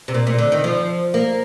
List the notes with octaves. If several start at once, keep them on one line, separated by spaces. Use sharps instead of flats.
C3
A#2
A#2
D3
D#3
F3
A#3